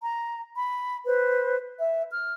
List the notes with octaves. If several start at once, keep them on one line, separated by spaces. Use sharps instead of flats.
A#5
B5
B4 C5
E5
F6